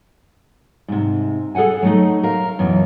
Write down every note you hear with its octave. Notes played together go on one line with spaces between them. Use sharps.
G#2 C3
G#4 A4 C5 F#5 G#5
F#3 A3 D#4
A#4 F5
F#2 B2 E3